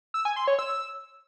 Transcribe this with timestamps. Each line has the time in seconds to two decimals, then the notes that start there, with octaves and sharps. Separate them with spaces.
0.14 E6
0.25 G#5
0.36 C6
0.48 C#5
0.59 E6